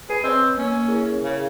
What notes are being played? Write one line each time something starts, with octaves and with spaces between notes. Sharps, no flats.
G#4 B4
C4 C#5 D#5
A#3 C#4 E6
E4 G#4 A#4
C#3